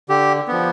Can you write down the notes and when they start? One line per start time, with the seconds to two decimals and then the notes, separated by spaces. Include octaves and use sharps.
0.09 D3 G4
0.48 F3 B3